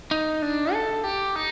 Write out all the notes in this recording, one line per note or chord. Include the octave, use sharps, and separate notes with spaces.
D#4
D4
A4
G4
D#4